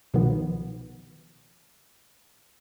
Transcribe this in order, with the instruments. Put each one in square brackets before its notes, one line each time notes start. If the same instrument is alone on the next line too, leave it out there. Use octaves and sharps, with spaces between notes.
[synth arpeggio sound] C2 B2 D#3 F3 B3